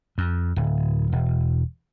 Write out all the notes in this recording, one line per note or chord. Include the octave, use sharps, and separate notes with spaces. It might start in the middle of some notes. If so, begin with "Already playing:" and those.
F2
D1
E1